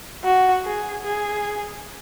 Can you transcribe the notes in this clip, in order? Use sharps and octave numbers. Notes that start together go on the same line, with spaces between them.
F#4
G#4
G#4